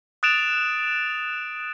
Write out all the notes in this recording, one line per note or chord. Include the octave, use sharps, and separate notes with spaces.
D#6 F#6 A6 D7 E7 F7